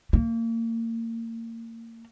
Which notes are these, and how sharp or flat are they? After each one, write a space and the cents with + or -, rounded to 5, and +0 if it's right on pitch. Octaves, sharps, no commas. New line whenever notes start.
A#3 -30